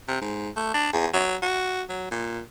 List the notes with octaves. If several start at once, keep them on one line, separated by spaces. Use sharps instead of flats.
C3
G#2
A3
D4
E2
F#3
F#4
F#3
A#2